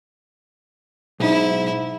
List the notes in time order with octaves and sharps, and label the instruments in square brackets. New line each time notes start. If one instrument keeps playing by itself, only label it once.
[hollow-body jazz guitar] B1 D#4 [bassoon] G#2 [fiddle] E4